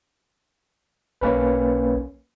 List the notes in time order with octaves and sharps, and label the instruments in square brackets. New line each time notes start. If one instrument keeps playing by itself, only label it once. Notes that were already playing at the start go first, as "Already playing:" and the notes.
[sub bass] B1 [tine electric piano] A#3 C#4 B4